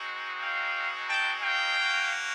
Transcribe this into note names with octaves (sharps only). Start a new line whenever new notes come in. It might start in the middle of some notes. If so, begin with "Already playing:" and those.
Already playing: G#3 C4 D#4 F#4
F5 G5
G5 A5
F5 G5
A#3 C#4 F#4